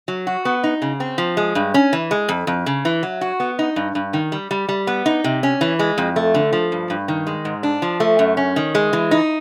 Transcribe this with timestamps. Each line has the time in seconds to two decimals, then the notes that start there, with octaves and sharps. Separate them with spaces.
0.08 F#3
0.27 F#4
0.45 B3
0.64 D#4
0.82 C#3
1.00 C4
1.18 F3
1.37 G#3
1.55 G2
1.74 C#4
1.93 E3
2.11 G#3
2.29 F2
2.47 F2
2.66 C#3
2.85 E3
3.03 F#3
3.21 F#4
3.40 B3
3.59 D#4
3.76 G2
3.95 G2
4.13 D#3
4.32 G3
4.51 G3
4.69 G3
4.87 B3
5.06 D#4
5.24 C3
5.43 C#4
5.61 E3
5.79 G#3
5.98 F2
6.16 A3
6.34 D3
6.53 F3
6.72 G2
6.90 G2
7.08 D#3
7.27 G#3
7.45 G#2
7.63 D4
7.82 F3
8.00 A3
8.19 F#2
8.37 C#4
8.56 D#3
8.75 G#3
8.93 E3
9.11 D#4